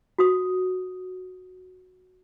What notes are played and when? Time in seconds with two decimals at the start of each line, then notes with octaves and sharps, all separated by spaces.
0.19 F#4 D#6